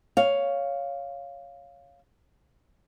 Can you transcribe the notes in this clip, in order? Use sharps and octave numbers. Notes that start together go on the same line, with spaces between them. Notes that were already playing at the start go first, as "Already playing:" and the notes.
C#5 F5